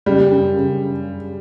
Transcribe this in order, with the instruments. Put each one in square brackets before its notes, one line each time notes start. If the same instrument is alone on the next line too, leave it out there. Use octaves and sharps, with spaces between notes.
[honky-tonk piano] C#3 [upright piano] G3
[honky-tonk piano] F#2
C#3